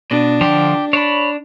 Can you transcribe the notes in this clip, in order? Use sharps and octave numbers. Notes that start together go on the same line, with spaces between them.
B2 D4
D3 F3 G4
D4 C#5 B5